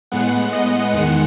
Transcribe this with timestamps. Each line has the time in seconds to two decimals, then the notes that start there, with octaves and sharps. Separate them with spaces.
0.12 A2 G#3 B3 F#5
0.53 D#5
0.93 E2 D#3 G#3 F#5